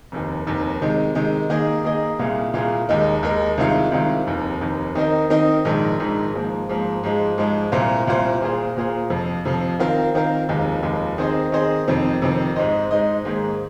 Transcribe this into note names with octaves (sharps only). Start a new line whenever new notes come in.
F1 D#2 D#3
F1 D#2 D#3
C3 D#3 G#3
C3 D#3 G#3
D#3 A#3 G#4 D#5
D#3 A#3 G#4 D#5
C2 A#2 A#3 F4 G#4
C2 A#2 A#3 F4 G#4
D#2 D#3 G#3 D#4 A#4
D#2 D#3 G#3 D#4 A#4
C2 C3 D#3 G#3 F4
C2 C3 D#3 G#3 F4
F1 D#2 D#3
F1 D#2 D#3
D#3 C4 D#4 A#4 D#5
D#3 C4 D#4 A#4 D#5
A#1 G#2 D#3
A#1 G#2 D#3
G#2 F3 A#3
G#2 F3 A#3
G#2 F3 G#3
G#2 F3 G#3
C2 A#2 A#3 F4 C5
C2 A#2 A#3 F4 C5
A#2 A#3 F4 G#4 C5
A#2 A#3 F4 G#4 C5
F2 C3 F3
F2 C3 F3
D#3 C4 F4 A#4
D#3 C4 F4 A#4
F1 D#2 D#3 G#3 F4
F1 D#2 D#3 G#3 F4
D#3 C4 G#4 C5 D#5
D#3 C4 G#4 C5 D#5
F2 C3 D#3 C4
F2 C3 D#3 C4
G#2 G#3 D#4 C5 D#5
G#2 G#3 D#4 C5 D#5
G#2 D#3 A#3 G#4 C5